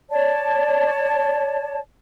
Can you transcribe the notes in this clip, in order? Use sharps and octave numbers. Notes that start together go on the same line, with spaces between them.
C#5 D5 A5